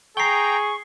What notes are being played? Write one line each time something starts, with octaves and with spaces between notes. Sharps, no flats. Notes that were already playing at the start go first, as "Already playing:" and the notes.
G#4 G5 A#5 C#6 C7 G7